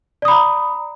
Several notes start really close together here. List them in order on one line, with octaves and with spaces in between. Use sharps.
D5 D#6 B5 A#5